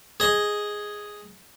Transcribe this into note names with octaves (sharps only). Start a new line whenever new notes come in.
G#4 D#5